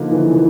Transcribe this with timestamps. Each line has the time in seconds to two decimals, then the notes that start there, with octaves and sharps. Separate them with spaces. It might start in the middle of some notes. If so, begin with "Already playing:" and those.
Already playing: D3 F3 A#3 D#4
0.11 E3
0.33 E3